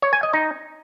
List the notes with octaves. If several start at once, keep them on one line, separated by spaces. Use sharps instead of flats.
C#5
G#5
D#5
D#4